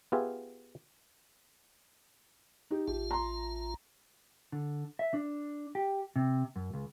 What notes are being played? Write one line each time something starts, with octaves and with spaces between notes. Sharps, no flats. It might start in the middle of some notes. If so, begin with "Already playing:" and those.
B3 F4 G4 G#4 E5
D#4 G4
A1 F4 G4
A#5 C6
D3
E5
D4
G4
C3
F#2
C#2